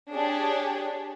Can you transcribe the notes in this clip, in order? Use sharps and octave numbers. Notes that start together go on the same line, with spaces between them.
D4 G4 G#4 C#5